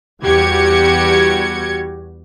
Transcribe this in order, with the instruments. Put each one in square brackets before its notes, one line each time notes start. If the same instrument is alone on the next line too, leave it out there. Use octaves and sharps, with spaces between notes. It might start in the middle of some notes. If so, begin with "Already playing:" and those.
[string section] E2 G3 F#4 G4 G#6 C#7